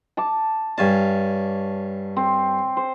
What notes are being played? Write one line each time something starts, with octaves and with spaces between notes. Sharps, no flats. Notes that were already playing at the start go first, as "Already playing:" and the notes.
A5 D6
G2 C#5 F5 G#5 A5
C4
C5